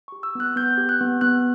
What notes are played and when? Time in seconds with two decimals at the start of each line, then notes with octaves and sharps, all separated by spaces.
0.08 G4 C#6
0.23 E6
0.35 B3 F#6
0.56 B3 G6
0.78 G4
0.89 F#6
1.01 B3
1.21 B3 F#6